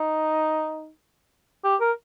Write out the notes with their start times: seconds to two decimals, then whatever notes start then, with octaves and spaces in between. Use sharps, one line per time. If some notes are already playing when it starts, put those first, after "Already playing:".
Already playing: D#4
1.64 G4
1.80 A#4